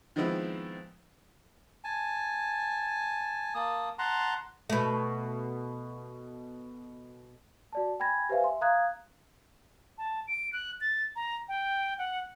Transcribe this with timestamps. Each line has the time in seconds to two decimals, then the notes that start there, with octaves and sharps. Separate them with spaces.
0.16 D#3 F3 G#3 B3 C4 E4
1.84 G#5 A5
3.55 A#3 A5 D#6
3.99 F#5 A5 A#5 C6
4.70 B2 A3
7.73 F#4 D5 A5
8.00 G5 G#5 B5 G#6 A#6
8.29 G4 B4 C5 E5 F5 G#5
8.41 E5 C6
8.61 F5 A#5 D#6 F#6 G#6
9.98 A5
10.28 D7
10.53 F#6
10.81 A6
11.16 A#5
11.48 G5
11.98 F#5